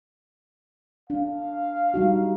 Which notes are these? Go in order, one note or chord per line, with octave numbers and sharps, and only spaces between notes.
D4 F5
G3 D#4 F#4